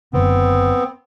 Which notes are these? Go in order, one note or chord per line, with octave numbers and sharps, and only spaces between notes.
F#1 F#2 D3 B3 C4